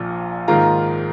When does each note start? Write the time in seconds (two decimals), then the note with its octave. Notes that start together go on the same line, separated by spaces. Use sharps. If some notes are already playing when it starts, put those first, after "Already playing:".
Already playing: A#1 A#2 F3
0.48 G#2 D#3 A#3 F4 A#5